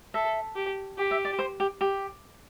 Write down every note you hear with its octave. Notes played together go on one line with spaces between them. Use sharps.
A4 E5
G4
G4
E5
D5
C5
G4
G4